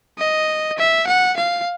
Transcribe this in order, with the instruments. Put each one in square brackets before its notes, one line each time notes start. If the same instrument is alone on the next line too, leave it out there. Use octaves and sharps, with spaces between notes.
[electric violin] D#5
E5
F#5
F5